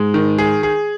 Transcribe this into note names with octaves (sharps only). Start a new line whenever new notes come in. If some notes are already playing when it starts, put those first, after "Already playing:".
Already playing: G#2 G#3
D#3
G#4
G#4